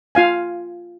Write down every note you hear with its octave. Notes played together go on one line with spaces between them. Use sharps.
F4 F5 G#5